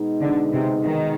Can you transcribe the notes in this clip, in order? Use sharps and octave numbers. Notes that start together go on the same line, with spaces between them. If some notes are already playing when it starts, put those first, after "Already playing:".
Already playing: B2 G#3 B3 D#4
D3
C3
D#3